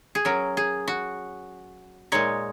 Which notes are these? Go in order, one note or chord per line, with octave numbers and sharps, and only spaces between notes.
G#4
F#3 C#4 A#4
G#4
F#4
A#2 G#3 D#4 C#5